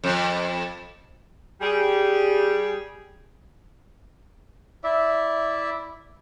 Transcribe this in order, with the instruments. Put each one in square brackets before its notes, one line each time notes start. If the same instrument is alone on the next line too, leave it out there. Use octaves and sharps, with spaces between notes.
[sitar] F2
[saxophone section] G3 G#4
[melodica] E4 D5 E5